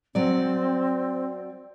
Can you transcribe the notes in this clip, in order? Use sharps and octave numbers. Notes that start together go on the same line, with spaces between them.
F#3 C4 D5